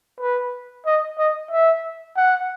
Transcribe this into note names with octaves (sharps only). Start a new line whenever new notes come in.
B4
D#5
D#5
E5
F#5